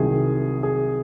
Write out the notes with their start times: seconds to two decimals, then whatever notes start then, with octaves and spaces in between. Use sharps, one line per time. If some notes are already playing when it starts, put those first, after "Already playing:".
Already playing: C2 C3 D#3 F#3 G#4
0.63 G#4